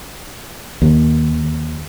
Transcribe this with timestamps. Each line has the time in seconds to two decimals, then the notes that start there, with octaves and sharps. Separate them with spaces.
0.82 D#2